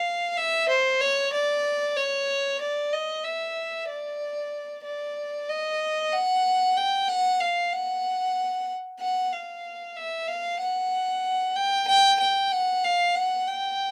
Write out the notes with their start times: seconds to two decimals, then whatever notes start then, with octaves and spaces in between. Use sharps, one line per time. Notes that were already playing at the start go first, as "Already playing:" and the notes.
Already playing: F5
0.37 E5
0.69 C5
1.01 C#5
1.33 D5
1.96 C#5
2.61 D5
2.93 D#5
3.24 E5
3.88 D5
4.84 D5
5.48 D#5
6.13 F#5
6.77 G5
7.08 F#5
7.40 F5
7.72 F#5
9.00 F#5
9.32 F5
9.96 E5
10.28 F5
10.60 F#5
11.56 G5
11.87 G5
12.20 G5
12.52 F#5
12.84 F5
13.15 F#5
13.48 G5